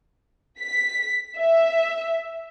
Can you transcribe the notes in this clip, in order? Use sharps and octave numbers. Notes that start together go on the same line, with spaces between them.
B6
E5